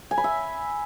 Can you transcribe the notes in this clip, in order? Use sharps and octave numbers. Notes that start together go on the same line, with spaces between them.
G#5
B5
E5